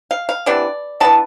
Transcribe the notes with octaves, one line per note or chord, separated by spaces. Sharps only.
F5
F5
C3 E3 B3 D4 D5
E3 B3 D4 A5